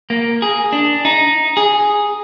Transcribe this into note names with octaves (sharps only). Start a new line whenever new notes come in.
A#3
G#4
D4
D#4
G#4